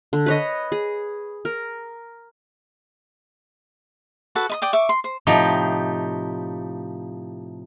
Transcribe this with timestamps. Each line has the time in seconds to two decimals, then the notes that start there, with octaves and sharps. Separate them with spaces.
0.13 D3
0.26 B4 C#5 D#5
0.72 G#4
1.45 A#4
4.35 F#4 A4 B4
4.50 D#5 B5 D#6
4.62 D5 G5 D#6
4.73 E5 C#6 D6
4.89 C6
5.04 C5
5.27 A2 C3 F3 D#4 G4